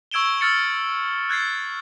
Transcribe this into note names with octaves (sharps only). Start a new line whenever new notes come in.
C#6 E6 G#6 D7 E7 G7
E6 F6 A6 C#7
F#6 G#6 A6 C7